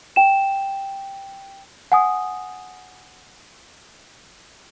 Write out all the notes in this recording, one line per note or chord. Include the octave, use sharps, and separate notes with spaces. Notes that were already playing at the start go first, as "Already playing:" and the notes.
G5 E7
F#5 G#5 D#6